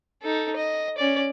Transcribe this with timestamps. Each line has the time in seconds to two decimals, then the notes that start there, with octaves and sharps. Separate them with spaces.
0.22 D#4 A4
0.56 D#5
0.98 C#4 D5